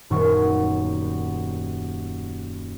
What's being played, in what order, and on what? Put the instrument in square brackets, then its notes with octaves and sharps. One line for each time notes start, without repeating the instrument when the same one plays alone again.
[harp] D#1 F#2 D#3 B3 C#6